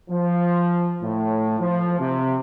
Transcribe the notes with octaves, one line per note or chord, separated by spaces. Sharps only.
F3
A2
F3
C3